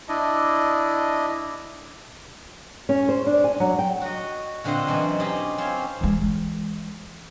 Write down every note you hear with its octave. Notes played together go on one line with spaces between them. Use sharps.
D4 E4 D#5
C#4
C5
D4
G#5
F#3
G5
F#4 D#5
A#2 D3 C4 C5 D#5 F#5
F#2 B2 E3
C#4 D#4 G4 C5 D5 D#5
C4 C#4 F4 C5 C#5
E3 G#3